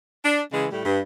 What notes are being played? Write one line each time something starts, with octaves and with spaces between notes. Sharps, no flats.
D4
C#3 E3 G#3
A2 G3 A3
G2